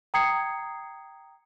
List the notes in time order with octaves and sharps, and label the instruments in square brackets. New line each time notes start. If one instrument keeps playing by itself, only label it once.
[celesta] G5 A#5 D#6 G#6 C7 C#7